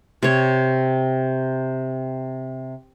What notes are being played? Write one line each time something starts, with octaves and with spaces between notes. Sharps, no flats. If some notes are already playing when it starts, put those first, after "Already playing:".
C3 C#5